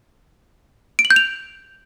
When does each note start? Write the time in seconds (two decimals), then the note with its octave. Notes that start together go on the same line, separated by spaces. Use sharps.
0.99 D7
1.05 F#7
1.11 G6
1.16 F7